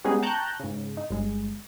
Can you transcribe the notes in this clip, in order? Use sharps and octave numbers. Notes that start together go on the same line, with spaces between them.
G3 G#3 B3 C#4 D#4 G#4
G5 A5 A#5 C#6 F#6 G6
G#2 C#3
D#4
G1 G#3